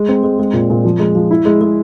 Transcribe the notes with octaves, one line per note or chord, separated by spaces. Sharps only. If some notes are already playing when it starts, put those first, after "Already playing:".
Already playing: G#3
C4
G#3
G#3
A#2
A#2
F3
G#3
F3
E4
G#3
G#3